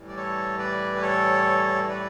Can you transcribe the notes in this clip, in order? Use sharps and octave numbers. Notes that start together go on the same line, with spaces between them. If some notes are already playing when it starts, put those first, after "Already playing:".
Already playing: A2 E3 G3
D5
A4 C#5
B4 D5
B4
A4 C#5
B4 D5